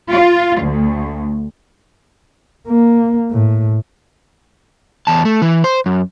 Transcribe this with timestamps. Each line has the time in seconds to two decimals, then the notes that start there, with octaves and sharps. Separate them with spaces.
0.12 F4
0.61 D2
2.68 A#3
3.31 A2
5.07 E2 A5
5.25 A3
5.42 E3
5.64 C5
5.86 F#2